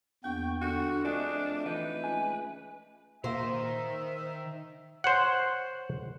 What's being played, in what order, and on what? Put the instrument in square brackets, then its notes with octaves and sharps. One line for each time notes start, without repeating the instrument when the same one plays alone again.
[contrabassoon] A#1 [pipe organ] E2 B3 C#6 [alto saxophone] G5
[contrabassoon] D3 [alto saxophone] F#4
[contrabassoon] F2 [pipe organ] A3 [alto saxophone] D4 [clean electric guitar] G#4 D#5
[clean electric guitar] E3 D#4 D#5 [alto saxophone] B4
[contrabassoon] C#2 [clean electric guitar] G#5
[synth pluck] A#2 A#3 [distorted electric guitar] D#3 A#5 [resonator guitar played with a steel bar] C5 [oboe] E5
[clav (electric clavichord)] C5 C#5 F#5